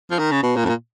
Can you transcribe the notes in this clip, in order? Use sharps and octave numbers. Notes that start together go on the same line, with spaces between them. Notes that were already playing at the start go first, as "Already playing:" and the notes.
F3
D#3
C#3
B2
A#2
F2
A#2